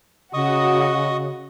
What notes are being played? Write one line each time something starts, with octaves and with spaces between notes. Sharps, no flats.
C#3 F#4 D#5 C#6 D#6